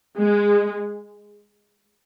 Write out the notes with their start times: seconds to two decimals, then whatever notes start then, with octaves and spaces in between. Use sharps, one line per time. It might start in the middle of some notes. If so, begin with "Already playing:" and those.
0.18 G#3